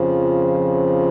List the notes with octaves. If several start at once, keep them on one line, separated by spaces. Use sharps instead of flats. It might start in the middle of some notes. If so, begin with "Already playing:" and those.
Already playing: F2 C#3 F3